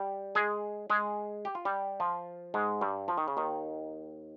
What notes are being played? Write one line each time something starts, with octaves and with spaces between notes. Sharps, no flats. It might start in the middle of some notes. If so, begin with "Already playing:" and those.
Already playing: G3 G4
G#3 G#4
G#3 G#4
G4
F4
G3 G4
F3 F4
G#2 G#3
G2 G3
F3
D#3
C#3
D#2 D#3